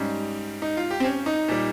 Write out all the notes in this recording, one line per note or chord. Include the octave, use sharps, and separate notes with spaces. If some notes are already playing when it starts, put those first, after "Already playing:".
Already playing: G#2 G3 C#4
D#4
F4
G4
C4
C#4
D#4
A#2 G3